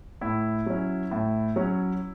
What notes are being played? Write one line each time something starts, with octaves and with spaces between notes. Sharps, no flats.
A2 E4
F#3 C#4
A2
F#3 C#4